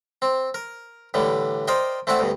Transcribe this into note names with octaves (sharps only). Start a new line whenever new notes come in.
C4
A#4
A2 D3 E3 G3
A#4 C5 D5 D#5 G5
A3 C4 E4 D5 F#5
D2 G2 B2